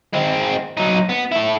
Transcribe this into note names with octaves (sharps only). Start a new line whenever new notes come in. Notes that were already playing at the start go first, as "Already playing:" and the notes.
G#3 C4
F#3 D#4
B3
E4 A4